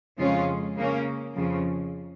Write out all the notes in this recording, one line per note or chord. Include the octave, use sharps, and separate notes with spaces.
F2 C#3 G#3 C#4 F4
C#3 A#3 C#4
F2 C#3 F3